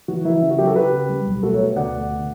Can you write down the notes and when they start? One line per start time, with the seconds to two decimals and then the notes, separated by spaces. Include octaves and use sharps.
0.08 E3 F#4
0.25 E3 E4
0.42 C#3 E4
0.50 F#4
0.58 F#3 E4 G4
0.67 F#4 A4
0.75 C#3 G4 B4
0.92 C#3
1.09 G3
1.26 B1
1.43 A3 F#4 A4
1.54 A4 C#5
1.59 B2
1.76 D2 D5 F#5
1.93 A3
2.11 B2